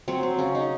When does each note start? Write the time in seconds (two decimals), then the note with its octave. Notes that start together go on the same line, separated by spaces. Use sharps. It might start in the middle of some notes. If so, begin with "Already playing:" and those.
0.08 F#3 C4
0.23 C4
0.38 C#3 C#4
0.55 D#4